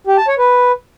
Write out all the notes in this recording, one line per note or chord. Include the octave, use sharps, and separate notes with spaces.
G4
A5
C#5
B4